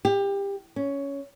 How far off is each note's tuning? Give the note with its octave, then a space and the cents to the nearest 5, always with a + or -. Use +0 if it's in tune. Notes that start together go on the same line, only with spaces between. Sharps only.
G4 +25
C#4 +10